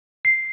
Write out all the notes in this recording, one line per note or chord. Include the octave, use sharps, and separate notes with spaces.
C7